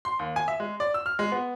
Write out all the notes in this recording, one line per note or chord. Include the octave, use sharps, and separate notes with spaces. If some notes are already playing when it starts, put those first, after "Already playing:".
C6
D#2
G#5
E5
G#3
D5
E6
F6
G#3
B3